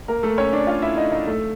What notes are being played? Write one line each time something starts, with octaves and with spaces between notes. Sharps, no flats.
A#3 A#4
A3 A4
C#4 C#5
D4 D5
F4 F5
E4 E5
D#4 D#5
D#4 D#5
A3 A4